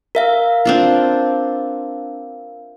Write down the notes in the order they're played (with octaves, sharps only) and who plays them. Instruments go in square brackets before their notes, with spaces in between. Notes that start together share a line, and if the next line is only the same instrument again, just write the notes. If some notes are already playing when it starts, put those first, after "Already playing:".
[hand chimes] A#4 E5 F5
[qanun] C4 D4 F4